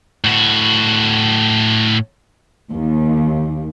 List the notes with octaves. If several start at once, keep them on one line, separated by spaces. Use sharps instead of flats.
A2 F#4
D#2